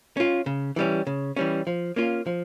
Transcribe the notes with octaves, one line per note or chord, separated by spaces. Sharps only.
C#4 F4
C#3
E3 G3 C#4
C#3
E3 G3 C#4
F3
A#3 C#4 F4
F3